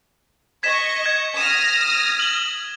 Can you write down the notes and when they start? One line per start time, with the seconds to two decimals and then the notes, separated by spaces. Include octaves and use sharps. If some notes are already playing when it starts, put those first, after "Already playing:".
0.63 D#5 C#6 G#6 B6 E7
1.06 G#6
1.37 D#6 F6 A#6 E7
2.20 F#7 G7